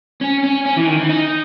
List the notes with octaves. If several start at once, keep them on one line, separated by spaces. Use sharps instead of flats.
C#4
C#4
C#4
E3
D#3
E3
D#4